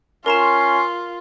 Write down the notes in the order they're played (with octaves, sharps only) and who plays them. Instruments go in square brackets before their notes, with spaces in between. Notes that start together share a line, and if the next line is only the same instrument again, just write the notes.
[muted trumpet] C#4 [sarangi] F4 [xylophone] A#4 A#5 E7 [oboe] C6